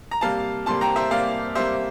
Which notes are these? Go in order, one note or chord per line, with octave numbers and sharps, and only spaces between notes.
A#5
C3 G3 A#3 F5 A5
C3 G3 A#3 A5 C6
G5 A#5
C5 E5
C3 G3 A#3 D5 F5
C3 G3 A#3 C5 E5